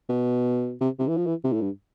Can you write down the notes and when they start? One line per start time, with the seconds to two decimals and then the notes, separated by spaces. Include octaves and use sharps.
0.09 B2
0.81 C3
0.99 C3
1.08 E3
1.17 F3
1.26 E3
1.44 C3
1.53 A2
1.62 G2